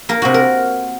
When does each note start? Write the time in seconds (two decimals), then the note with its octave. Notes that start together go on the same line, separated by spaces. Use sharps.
0.09 A#3 A#4
0.22 C3 F#4
0.34 A#4